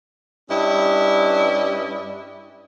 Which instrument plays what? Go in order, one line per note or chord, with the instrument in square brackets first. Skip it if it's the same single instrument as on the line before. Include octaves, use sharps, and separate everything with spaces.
[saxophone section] G2 C#4 E4 D5 D#5